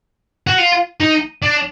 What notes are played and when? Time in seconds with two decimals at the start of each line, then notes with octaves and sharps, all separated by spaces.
0.47 F#4
0.58 F4
1.00 D#4
1.42 D4